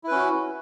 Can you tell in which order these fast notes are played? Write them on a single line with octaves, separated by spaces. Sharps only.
E4 B4 C#4 F#4